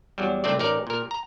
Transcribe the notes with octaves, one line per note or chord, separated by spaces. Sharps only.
E2 F#3 G3
C2 A3 C4 D4 D5
A1 D#4 A#4 D5
A#2 A#4
A#5